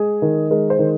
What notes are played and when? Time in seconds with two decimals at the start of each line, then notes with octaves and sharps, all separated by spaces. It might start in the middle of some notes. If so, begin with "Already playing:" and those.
Already playing: G#3 G#4
0.22 D#3
0.50 G#3 A#4
0.70 C5
0.79 D#3